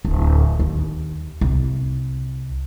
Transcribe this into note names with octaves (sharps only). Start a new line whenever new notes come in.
D1
D#2
C2